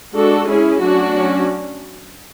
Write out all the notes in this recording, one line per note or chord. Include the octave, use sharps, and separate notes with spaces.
G#3 D4 F#4 A4
G#3 C#4 E4 G#4
F#3 A3 C#4 D4 F#4
F#3 C#4